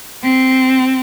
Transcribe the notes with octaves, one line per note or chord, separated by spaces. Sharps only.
C4